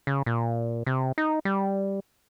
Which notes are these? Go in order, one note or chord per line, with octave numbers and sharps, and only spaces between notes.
C#3
A#2
C3
D#4
G3